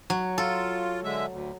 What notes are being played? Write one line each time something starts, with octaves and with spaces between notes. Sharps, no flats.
F#3
F4 A4
D3 G#3 E5
D2